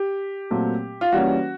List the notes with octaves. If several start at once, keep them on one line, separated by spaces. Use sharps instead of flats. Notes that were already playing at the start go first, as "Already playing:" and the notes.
Already playing: G4
A#2 F#3 A3 C4
F4
E3 G3 A#3 C#4 F#4